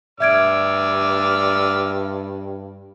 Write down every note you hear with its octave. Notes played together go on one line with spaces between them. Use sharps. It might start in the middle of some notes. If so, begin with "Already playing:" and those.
G2 D5 E5 E6 F6 G#6 D7